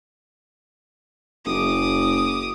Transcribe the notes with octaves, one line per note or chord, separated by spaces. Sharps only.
F#1 D6 D#6